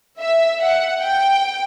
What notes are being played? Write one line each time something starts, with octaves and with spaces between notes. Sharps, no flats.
E5
F#5
G5